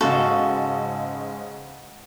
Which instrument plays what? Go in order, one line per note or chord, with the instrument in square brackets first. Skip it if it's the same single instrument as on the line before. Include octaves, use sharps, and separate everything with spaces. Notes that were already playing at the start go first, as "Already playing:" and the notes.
[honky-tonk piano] G#2 C#3 D#5 [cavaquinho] F#4 A4 F5